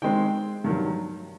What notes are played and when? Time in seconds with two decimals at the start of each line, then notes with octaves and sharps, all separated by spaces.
0.02 D#3 G#3 C4 G5
0.64 G2 D#3 F#3